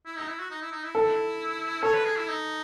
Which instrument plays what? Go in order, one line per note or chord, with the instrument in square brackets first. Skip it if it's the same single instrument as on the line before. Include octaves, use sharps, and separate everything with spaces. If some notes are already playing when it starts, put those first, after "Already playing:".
[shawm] E4
D#4
E4
F#4
D#4
E4
D#4
E4
[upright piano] A4
[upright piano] A4 [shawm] C#5
[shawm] B4
G#4
E4
D#4